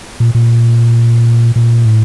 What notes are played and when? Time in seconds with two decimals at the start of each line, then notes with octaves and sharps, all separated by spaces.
0.20 A#2
0.35 A#2
1.56 A#2
1.85 A2